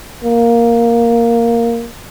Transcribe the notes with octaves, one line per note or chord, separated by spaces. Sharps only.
A#3